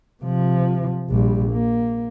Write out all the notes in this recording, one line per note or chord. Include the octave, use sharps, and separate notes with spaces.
C3 F3
A#1 G3
A#3